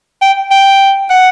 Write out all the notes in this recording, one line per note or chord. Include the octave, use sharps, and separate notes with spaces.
G5
G5
F#5